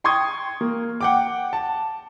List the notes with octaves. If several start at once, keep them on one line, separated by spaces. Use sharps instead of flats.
G5 C6 C#6 D#6 G#6
A#3
F#5 G5 D6
A5